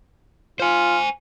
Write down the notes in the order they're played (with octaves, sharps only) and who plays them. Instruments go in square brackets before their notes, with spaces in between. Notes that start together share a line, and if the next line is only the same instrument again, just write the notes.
[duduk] F4 [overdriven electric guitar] C5 G#5